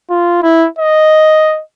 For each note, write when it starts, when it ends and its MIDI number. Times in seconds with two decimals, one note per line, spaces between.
0.10 0.42 65
0.43 0.67 64
0.79 1.61 75